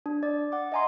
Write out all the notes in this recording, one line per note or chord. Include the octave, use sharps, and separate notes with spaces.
D4
D5
F#5 D6
D#5 E5 G#5 A#5 C6